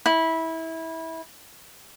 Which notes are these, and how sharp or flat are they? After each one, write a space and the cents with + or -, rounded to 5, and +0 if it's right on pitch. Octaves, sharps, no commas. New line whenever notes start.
E4 -20